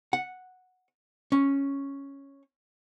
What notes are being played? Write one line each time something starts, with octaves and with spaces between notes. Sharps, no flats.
F#5
C#4